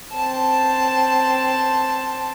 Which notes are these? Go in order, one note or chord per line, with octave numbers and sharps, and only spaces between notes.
C4 A5